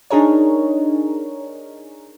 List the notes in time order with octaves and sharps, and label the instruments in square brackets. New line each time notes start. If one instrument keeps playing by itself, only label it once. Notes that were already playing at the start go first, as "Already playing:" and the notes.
[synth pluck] D4 D#4 G#4 A#4 C#5